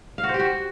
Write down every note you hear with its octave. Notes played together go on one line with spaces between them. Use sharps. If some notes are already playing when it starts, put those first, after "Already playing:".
F5
F#4
C5
G4
F#4